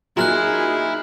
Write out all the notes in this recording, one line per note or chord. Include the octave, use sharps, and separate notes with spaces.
A#2 F#3 D#4 E4 G#4 A#5 F6 F#6